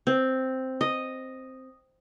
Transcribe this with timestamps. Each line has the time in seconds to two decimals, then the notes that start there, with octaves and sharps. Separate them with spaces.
0.07 C4
0.81 D#5